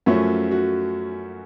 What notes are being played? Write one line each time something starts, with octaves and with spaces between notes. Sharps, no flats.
F#2 F3 A3 C#4 F#4
F#4